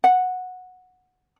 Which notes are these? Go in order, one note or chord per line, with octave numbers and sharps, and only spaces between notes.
F#5